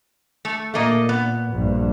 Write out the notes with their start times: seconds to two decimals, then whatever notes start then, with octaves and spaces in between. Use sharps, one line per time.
0.45 A3
0.74 A#2 A3 A#3 D#5
1.09 B3
1.52 A#1 G2